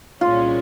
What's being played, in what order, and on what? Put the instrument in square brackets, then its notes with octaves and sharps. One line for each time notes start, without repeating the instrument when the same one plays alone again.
[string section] C2 A#2 G#3 C#4 [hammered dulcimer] F4